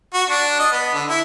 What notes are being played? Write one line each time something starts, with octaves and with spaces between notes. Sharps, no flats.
F#4
D4
D#5
B3
D3
E4